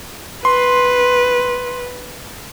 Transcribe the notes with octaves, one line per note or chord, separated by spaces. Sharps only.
B4 C6